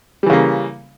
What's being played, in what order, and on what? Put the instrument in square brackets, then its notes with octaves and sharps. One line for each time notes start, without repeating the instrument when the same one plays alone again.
[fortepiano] G3
E3
C#3
A#3